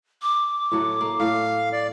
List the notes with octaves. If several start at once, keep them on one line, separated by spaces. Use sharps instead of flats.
D6
A2 F#3 A3
A#3
A2 F5
D5